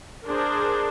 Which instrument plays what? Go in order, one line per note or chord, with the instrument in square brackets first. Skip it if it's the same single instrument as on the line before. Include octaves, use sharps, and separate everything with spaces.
[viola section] D4 G#4 A#4 C5